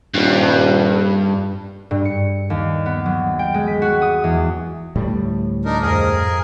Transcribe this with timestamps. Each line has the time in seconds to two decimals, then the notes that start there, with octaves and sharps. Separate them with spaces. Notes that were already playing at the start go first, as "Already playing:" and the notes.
0.15 D#1 G2
1.91 G2
2.05 C#7
2.50 D#2
2.86 B3
3.06 F#3
3.39 G5
3.54 G#3
3.68 B6
3.82 F#4
4.02 D#6
4.24 E2
4.95 D2 A2 G3
5.65 D4 D#4 A#4
5.82 F2 G#2 G#4 A#4 A#6